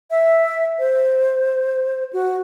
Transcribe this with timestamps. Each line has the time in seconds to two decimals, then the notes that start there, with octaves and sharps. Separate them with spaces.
0.11 E5
0.79 C5
2.13 F#4